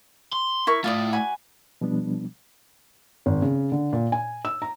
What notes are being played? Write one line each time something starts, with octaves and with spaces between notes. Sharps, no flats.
C6
E4 A#4 C#6
A3 E4 F4 D5 D#6
F#4 G#5 B5
B2 F3 G3 B3 D4
G#1
C#3
D3
A#2
G#5
E6
A#5